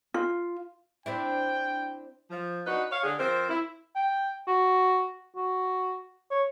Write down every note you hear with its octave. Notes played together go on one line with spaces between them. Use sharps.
F4
C4 D4 E4 G5
F3
D4 D#4 F#4 B4
C#5 F5
D3 G#4
F3 C4 A#4 C5
E4
G5
F#4
F#4
C#5